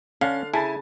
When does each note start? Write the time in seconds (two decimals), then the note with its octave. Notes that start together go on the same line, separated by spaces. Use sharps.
0.21 D3 C#4 D4 F5
0.54 C#3 E4 G#5 A5 A6